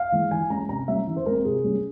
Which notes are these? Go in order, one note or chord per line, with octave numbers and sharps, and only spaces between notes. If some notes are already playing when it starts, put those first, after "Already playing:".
Already playing: F5
E3 G#3
E3 G#5
G#3 C#4 A#5
C3 A#5
G3 C#4 E5
E3
C5
G#3 C4 A#4
C3 G#4
G3 C#4